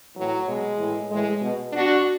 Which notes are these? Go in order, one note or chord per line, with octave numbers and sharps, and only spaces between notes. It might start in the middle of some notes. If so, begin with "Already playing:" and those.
A2 E3 F#3
B2 G#3
A2 E3
A2 E3 G#3
B2
B2 D4 F#4